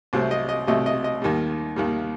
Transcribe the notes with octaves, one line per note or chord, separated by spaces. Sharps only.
C2 C3 F#3 A3 C5
D#5
D#5
C2 C3 F#3 A3 D#5
D#5
D#5
D#2 D#3 G3
D#2 D#3 G3